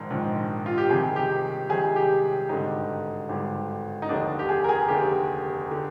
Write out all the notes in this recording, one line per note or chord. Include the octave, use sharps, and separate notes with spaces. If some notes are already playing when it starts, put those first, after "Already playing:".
Already playing: A#1 G#2 D#3
A#1 G#2 D#3
F4
G4
C2 C3 D#3 G#4
G4
C2 C3 D#3 G#4
G4
G#1 G2 D3 D#4
G#1 G2 D3
D#4
F1 D#2 D3 D4
G4
G#4
A#4
G#4
F1 D#2 D3 G4
D3